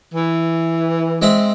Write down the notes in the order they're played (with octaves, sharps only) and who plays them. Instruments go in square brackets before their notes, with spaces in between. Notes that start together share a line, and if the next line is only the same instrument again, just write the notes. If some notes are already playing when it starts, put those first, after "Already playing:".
[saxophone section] E3
[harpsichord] G#3 C4 E5